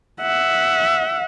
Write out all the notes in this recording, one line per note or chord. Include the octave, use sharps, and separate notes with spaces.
E5 F#5